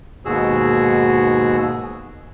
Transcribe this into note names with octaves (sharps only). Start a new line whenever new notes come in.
D#2 G#2 B2 F#4 G#4 E6